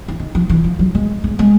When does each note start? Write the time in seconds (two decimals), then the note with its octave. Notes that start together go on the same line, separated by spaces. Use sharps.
0.08 E3
0.20 D#3
0.35 F3
0.49 E3
0.64 F3
0.79 F#3
0.95 G#3
1.24 G#3
1.39 G#3